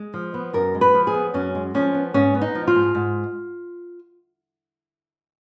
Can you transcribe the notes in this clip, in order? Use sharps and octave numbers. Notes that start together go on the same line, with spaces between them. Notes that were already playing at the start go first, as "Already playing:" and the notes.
Already playing: G#3
F3
B3
F#2 A#4
G#3
B4
F3
G#4
B3
F#2 C#4
G#3
F3 C#4
B3
G#2 C#4
B3
D#4
F3
F4
G#2
G#2